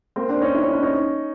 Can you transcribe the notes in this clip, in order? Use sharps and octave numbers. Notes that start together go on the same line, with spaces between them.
A#3 C4
C4 D4
C#4 D#4
D4 E4
C#4 D#4
C4 D4
C#4 D#4